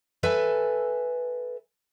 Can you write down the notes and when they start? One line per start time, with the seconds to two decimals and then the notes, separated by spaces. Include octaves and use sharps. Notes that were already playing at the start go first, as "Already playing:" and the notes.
0.23 A4 B4 E5 G#5